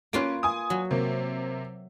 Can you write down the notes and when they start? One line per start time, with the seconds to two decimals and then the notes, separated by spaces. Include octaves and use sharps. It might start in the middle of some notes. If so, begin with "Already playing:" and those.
0.13 A#3 C#4 F4 B4 D7
0.43 G#5 D#6
0.70 F#3
0.91 C3 A#3